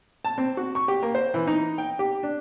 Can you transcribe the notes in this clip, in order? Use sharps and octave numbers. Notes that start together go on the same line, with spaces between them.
A5
C4
F#4
C#6
G4
A#3
C5
E3
D#4
G5
G4
D4